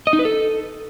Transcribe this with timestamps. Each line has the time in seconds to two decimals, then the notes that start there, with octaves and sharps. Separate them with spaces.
0.07 D#5
0.13 D#4
0.19 B4
0.25 A4